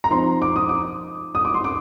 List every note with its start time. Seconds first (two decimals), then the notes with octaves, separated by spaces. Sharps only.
0.04 A#5
0.11 F3 C4 D#4 C6
0.42 D6
0.56 D#6
0.69 D6
1.35 D#6
1.45 D6
1.54 C6
1.64 D6